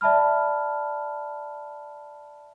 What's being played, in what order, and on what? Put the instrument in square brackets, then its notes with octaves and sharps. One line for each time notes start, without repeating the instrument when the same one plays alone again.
[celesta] D5 E5 A5 B5 F6